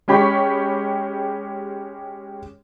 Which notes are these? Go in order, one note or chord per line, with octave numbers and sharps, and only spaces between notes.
G#3 C#4 G4 B5 C#6 B6